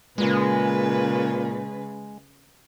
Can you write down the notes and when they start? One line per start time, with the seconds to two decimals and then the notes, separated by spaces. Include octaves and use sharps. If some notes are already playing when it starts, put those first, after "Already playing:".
0.18 A#2 C#3 G#3 B4